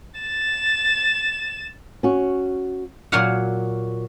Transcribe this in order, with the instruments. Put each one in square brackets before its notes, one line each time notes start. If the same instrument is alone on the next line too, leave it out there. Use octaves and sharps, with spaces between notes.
[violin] A6 E7
[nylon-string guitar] C#4 F#4
[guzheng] A#2 F#3 F#4 C#5 F5 F#5